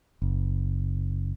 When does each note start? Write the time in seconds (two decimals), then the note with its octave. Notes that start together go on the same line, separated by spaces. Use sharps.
0.22 F#1